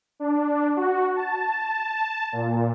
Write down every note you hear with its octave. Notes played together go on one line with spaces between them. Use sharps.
D4
F#4
A5
A#2